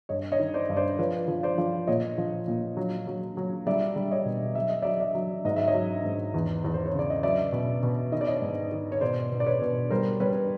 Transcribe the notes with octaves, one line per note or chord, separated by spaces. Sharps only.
G2 C#5 D#5
C#5 D#5
D#3
C5 D5
G2
C5 D5
F3 B4 C#5
F3
C5 D5
F3
A#2 C#5 D#5
F3
A#2
F#3
F#3
F#3
G3 D5 E5
G3
C#5 D#5
B2
F#3 E5
D#5
F#3 D5 E5
D5 E5
F#3
G#2 D#5
E5
C#5 D#5
F#3
G#2
E2
E2
C5
C#5
C#3
D5
D#5
F#3 D5 E5
B2
B2
D#3 D#5
D5
C#5 D#5
G#2
D#3
C#5
B2 C5 D5
B2
D5
B4 C#5
B2
G3 A#4 C5
G3 B4 C#5